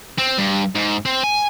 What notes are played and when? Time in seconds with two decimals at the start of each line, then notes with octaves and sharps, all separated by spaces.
0.19 C4
0.38 G2
0.75 G#2
1.06 C4
1.24 G#5